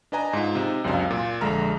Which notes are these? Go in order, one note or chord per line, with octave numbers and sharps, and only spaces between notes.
D4 B4 D#5 G#5 A#5
G#2 F4
C3 D#4
C#2 F#2 C3 F#3 D4 F5
A#2
A#1 D3 G#3 A#5 F6